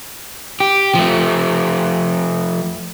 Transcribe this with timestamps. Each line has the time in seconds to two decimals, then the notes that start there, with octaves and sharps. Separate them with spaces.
0.60 G4
0.95 F3 A3